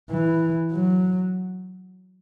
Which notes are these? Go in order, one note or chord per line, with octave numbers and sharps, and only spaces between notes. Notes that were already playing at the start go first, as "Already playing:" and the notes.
E3
F#3